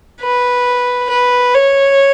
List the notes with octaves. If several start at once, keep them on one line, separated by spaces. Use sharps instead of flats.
B4
B4
C#5